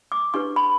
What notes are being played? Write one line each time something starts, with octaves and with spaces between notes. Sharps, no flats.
D6
D4 G4 B4 C#6
B5